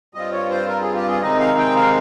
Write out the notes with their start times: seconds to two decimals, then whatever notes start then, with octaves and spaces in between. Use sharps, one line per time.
0.14 G2 G3 C4 F4 D#5
0.32 C#5
0.50 C5
0.68 A#4
0.81 G#4
0.95 G4
1.08 G#4
1.22 C3 D#3 G#3 C4 D#4 D#5
1.40 F5
1.58 G5
1.75 F5